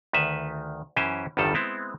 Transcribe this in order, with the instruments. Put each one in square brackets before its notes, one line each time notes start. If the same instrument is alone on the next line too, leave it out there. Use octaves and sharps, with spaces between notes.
[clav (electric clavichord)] D2 D#3 B4 E5
F#2 E3 C#4 G4 C5 G#5
G1 E2 G2 D#3 G3 A4
G#3 B3 C4 E4